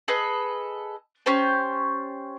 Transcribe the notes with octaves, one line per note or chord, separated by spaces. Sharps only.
G#4 A4 B4 D#5
C#4 G4 C5 A5